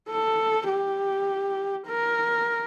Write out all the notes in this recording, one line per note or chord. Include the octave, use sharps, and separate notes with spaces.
A4
G4
A#4